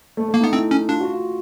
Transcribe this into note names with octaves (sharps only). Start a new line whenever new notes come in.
A3
A3
A#3
B3 D#4
C4 E4
C#4
D4 F4
F#4
F4